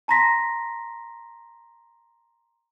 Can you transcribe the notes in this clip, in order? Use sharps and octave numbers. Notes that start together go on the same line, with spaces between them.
A5 A#5 C6 A#6 B6